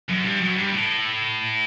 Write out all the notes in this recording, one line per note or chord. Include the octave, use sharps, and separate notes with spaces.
F#2
G2
F#2
G2
A2